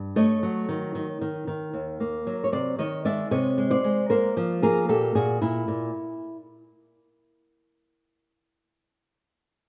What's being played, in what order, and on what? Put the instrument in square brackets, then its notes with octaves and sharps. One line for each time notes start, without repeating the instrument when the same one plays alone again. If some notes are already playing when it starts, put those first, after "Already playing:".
Already playing: [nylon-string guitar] G2
A3 C#5 D#5
F#3
D#3
D#3
D#3
D#3
D#2
A#3
F#3
C#5
C3 C5 D5
D#3 C#5 D#5
G#3 D5 E5
C3 C#5 D#5
G#3
C5 D5
G#3
A#3 A#4 C5
F3
A#3 G#4 A#4
A#2 G4 A4
A#2 F#4 G#4
A#2 E4
A#2